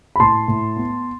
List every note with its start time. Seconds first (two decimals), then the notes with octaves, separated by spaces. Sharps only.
0.16 B5
0.20 A2 A5 C6
0.48 A2
0.76 B3